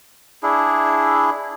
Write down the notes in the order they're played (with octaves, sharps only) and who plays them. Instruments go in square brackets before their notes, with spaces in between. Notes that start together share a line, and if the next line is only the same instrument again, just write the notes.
[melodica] D4 E4 G#4